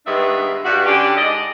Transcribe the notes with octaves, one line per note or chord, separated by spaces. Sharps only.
G2 D#3 G#3 B3 D4 E5
G2 F#4
D3 C#4 D4 G4
G#2 D5 D#5